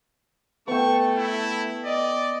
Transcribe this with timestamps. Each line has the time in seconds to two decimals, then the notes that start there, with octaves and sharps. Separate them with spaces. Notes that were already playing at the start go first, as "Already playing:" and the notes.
0.68 A3 B3 A4 G5 C#6
1.17 E4
1.85 D5 D#5